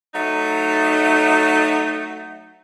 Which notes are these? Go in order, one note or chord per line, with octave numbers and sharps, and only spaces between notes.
F#3 A3 D#4